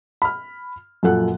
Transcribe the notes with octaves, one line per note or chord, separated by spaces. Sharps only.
B5 F6
F#2 A#2 F3 A4 F#5 F#6